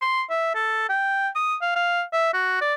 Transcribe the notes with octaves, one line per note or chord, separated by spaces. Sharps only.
C6
E5
A4
G5
D#6
F5
F5
E5
F#4
D5